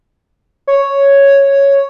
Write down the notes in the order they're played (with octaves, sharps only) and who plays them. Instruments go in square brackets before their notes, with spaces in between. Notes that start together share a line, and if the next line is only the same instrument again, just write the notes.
[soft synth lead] C#5